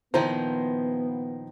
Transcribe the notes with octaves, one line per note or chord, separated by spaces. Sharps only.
A#2 D#3 F3 B3 E4 C5 A#5